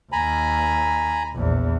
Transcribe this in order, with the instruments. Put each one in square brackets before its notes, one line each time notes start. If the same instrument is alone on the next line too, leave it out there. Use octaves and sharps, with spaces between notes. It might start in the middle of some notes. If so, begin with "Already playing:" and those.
[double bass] D#2 [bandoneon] G#5 A#5 B5
[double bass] A#1 E2